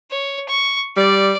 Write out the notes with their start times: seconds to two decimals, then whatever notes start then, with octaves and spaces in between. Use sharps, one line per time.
0.11 C#5
0.49 C#6
0.97 G3 D5